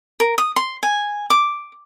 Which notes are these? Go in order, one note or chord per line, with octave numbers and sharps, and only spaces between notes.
A#4
D#6
C6
G#5
D6